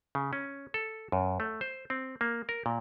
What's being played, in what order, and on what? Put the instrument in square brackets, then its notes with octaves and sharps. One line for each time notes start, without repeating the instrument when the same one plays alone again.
[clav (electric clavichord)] C#3
C#4
A4
F#2
A3
C5
C4
A#3
A#4
A#2